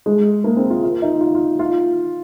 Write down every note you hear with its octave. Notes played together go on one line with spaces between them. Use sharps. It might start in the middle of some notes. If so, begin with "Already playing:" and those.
G#3
A#3
C4
F4
F4
D#4
F4
F4
F4